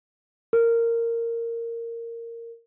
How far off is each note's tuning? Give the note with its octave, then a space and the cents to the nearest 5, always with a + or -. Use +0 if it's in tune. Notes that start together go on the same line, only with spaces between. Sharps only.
A#4 -10